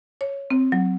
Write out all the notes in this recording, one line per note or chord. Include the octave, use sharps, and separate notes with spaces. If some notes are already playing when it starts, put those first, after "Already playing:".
C#5
C4
F#3